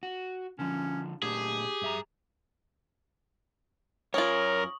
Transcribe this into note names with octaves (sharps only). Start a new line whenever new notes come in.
F#4
D3 F3 C#4
A#2 A3 D4 G4 G#4
G2 E5 A#5
F#2 C#4 F4 A#4 C#5 C#6 D#6 F#7